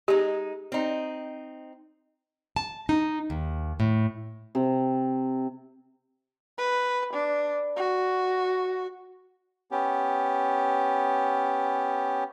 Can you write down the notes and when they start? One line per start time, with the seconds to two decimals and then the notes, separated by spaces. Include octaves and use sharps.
0.08 G#3 D#4 G4
0.72 C4 D#4
2.56 A5
2.89 D#4
3.30 D#2
3.80 A2
4.55 C3
6.58 B4
7.13 D4
7.76 F#4
9.71 B3 C#4 G4